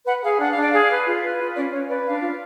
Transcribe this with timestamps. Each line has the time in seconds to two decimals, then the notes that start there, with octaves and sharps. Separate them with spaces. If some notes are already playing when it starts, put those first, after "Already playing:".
0.07 B4 F#5
0.23 G#4 F5
0.40 D4 F#5
0.50 F5
0.56 D4 D5
0.71 G#4 F5
0.89 B4
1.05 F4
1.22 B4
1.39 F4
1.55 C#4 D5
1.72 C#4 C#5
1.89 B4 D5
2.04 D4 F5
2.21 F4